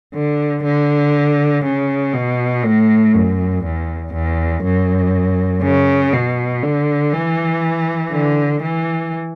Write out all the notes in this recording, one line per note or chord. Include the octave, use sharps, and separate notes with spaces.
D3
D3
C#3
B2
A2
F#2
E2
E2
F#2
C#3
B2
D3
E3
D3
E3